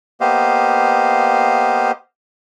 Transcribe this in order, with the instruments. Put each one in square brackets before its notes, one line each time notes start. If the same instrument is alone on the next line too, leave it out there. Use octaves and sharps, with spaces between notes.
[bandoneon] A#3 B3 G4 C5 D#5 F5